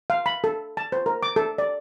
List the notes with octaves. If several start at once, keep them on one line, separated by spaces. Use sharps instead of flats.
F5
B5
A4
A5
C5
A#4
D6
A4
D5